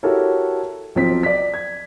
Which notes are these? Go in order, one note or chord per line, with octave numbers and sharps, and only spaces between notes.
E4 F#4 G4 A4 A#4 C#5
B1 F3 C4 B6
D5 B6
G#6